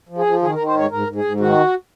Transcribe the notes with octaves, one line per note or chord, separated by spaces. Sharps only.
F3
G#4
F3
D#3 G#4
A#4
D#3
C5
G#2 C#5
G#2 A#4
G#2
G#4
G#2
D#3 F#4